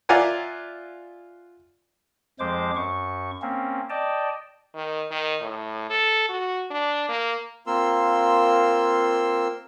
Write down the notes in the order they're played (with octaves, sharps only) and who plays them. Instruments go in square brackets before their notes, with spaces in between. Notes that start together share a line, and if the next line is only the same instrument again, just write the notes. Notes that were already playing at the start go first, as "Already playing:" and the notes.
[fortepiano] F4 D5 E5 F#5 G#5 A#5
[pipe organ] F2 F3 G#3 C5 D6
F#2 C#6
A#3 C4 C#4
D5 D#5 G5 A5
[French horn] D#3
D#3
A2
A4
F#4
D4
A#3
[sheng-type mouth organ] A#3 C4 F4 A#4 C6 E6